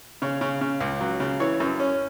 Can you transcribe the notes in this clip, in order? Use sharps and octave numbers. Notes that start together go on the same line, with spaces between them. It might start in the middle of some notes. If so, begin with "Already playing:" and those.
C#3 C#5
C#3
C#3
C#2
F#3
C#3
E3 C#5
F#2
C#4